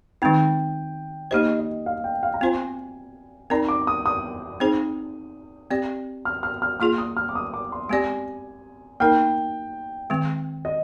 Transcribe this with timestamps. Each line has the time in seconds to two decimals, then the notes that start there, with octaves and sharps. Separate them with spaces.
0.22 D#3 G#3 C4 D#4 G5
1.31 A#3 D#4 G4 C5 D#5
1.59 D#5
1.86 F5
2.04 G5
2.23 F5
2.34 A#5
2.41 C4 F4 C5 G#5
3.50 C4 D#4 A#4 D5 A#5
3.69 D6
3.87 D#6
4.06 D#6
4.60 C4 D#4 G#4 C5
5.71 C4 G4 D5
6.25 F6
6.43 F6
6.62 F6
6.80 A#3 F4 G#4 F6
6.98 D#6
7.17 F6
7.29 D6
7.35 D#6
7.54 D6
7.72 C6
7.89 G#3 C4 G4 D5 G#5
9.00 A#3 D#4 A#4 G5
10.10 D#3 G#3 C4
10.65 D#5